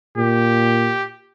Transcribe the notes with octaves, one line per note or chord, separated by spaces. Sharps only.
A#2 G4